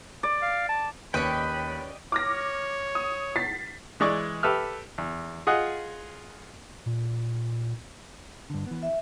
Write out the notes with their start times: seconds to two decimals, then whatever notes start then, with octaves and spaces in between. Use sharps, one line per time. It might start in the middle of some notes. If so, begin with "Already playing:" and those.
0.23 D5
0.42 F5
0.69 A5
1.14 D#2 C#4 B4 D5 D#5 G5 B5
2.12 C#5 D6 F6 A#6
2.95 D#6
3.36 A6 B6 C7
4.00 E3 G#3 D5 C#6
4.43 G4 A4 B4 E5 F6
4.98 E2
5.47 F4 G#4 D#5 F#5
6.86 A#2
8.50 G2 D3
8.67 E3 B3
8.83 E5